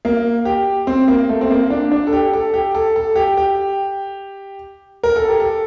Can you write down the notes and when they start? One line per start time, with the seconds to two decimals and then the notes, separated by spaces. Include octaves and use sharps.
0.05 A#3
0.45 G4
0.87 C4
1.08 A#3
1.29 A3
1.41 C4
1.51 A#3
1.70 D4
1.92 D4
2.07 A4
2.13 G4
2.33 A4
2.54 G4
2.75 A4
2.96 A4
3.16 G4
3.37 G4
5.03 A#4
5.16 A4
5.28 G4
5.40 A4